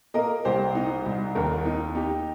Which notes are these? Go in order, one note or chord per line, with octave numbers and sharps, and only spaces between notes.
A#3 A#4 D#5
C2 G4 C5
D#4
C2
D#2 A#4
D#4
D#4 G4